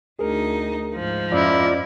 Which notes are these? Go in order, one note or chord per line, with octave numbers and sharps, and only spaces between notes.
D2 D#4 G#4 A#4
G#2 F3
F2 C#4 E4 F4 D5 D#5